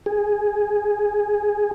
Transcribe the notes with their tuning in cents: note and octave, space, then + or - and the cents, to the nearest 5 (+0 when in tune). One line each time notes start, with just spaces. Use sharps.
G#4 -5